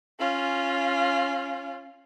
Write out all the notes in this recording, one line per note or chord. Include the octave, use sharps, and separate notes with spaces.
C#4 F4